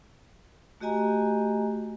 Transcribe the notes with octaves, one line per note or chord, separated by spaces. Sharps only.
A3 F#4 G4 D#5 G#5 A#5